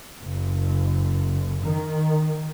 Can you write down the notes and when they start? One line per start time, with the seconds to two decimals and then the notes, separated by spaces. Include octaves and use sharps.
0.20 F#1
1.62 D#3